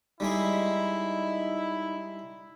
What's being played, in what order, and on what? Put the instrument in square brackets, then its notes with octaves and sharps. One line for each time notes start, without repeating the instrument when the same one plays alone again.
[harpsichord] G3 G#3 G#4 [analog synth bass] D#4 [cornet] E4